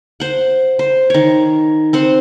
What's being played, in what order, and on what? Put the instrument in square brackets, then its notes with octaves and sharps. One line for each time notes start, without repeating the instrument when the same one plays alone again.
[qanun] C5 F#5
C5
D#3 C#5
C4 C5 F#5